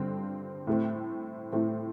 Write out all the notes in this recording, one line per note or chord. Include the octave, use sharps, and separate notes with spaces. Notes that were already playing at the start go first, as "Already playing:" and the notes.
Already playing: G2 D3 C4
A2 A3 C4
A2 A3 C4